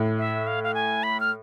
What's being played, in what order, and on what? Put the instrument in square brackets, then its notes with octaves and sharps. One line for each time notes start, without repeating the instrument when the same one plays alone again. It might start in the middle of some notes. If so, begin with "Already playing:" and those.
Already playing: [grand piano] A2
[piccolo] E5
F5
F5
G#5
B5
F6